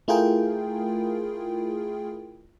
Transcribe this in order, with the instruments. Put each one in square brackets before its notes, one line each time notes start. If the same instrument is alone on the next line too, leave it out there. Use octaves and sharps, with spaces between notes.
[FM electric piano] A3 E4 F4 G#4 A#4 G5